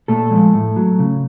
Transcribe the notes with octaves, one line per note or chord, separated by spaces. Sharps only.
A#2 A3 A4
F3 G#3
A2
F#3
C#3